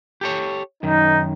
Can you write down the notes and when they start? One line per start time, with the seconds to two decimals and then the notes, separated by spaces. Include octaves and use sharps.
0.21 G4 A4 C#5
0.83 F#2 D#3 D#4